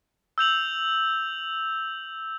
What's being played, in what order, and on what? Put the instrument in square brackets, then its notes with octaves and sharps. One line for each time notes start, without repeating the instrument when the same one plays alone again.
[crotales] E6 G6 F7 F#7